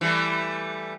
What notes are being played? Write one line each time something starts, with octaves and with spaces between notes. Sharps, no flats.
E3 G3 A3